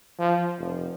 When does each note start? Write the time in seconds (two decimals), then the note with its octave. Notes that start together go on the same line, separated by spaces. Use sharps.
0.19 F3
0.59 F1